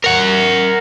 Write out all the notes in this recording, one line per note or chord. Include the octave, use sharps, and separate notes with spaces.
A#4 F#5